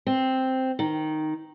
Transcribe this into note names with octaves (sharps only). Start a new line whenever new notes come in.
C4
D#3